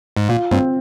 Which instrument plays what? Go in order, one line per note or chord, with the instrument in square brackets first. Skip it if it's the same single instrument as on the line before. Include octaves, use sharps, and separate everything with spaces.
[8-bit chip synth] G#2
[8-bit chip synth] A#2 [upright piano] F4
[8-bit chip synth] G2 [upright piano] C4